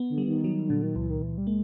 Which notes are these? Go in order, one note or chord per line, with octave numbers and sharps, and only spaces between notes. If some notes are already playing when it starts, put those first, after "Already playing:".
Already playing: B3
D3
G3
D#3
F#3
A#2 D3
D#3
C#2 E3
D#3
C#2 E3
G3
G#3 A#3